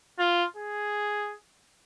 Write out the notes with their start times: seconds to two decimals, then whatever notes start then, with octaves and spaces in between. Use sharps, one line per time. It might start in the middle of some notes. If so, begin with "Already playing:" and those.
0.19 F4
0.57 G#4